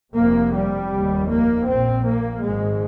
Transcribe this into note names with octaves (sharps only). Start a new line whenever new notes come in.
F1 F2 C3 A#3
G3
F1 D#2
A#3
A#1 A#2 C4
A#3
G#1 G#2 G#3